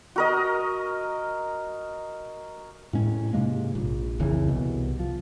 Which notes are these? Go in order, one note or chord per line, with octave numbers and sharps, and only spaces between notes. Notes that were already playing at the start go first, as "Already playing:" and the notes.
F#4 A#4 D#5
A2 G#3 C#4
G#2 C3 G#3 A#3
A#1
F1 C2 C#3 E3
C2 B2
F3